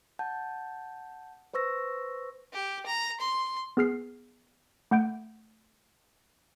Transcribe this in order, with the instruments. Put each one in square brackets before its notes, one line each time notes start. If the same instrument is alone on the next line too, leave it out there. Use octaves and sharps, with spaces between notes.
[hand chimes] F#5 A5 G6
B4 C5 C#6 E6 A#6
[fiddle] G4
A#5
C6
[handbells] B3 G#4 F6 C7
A3 F#5 G6 D7